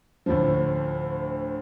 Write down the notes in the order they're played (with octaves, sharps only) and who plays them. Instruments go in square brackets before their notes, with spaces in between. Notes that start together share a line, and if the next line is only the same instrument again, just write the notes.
[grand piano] D2 A2 F3